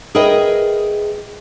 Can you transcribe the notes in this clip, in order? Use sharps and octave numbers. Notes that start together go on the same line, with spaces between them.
G#4 A#4 B4 D#5 E5 G5